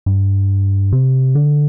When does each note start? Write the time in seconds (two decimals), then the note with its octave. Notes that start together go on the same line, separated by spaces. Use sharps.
0.06 G2
0.92 C3
1.35 D3